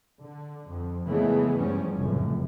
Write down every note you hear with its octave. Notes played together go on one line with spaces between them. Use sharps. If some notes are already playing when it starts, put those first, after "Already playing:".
D3
F2
C#3 E3 F3 G#3 A3 B3
E2 G2 F3 G3 C#4
F1 C#2 F#2 A2